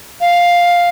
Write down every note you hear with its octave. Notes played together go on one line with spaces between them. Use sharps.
F5